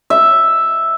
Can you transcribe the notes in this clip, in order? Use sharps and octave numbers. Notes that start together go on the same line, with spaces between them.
E5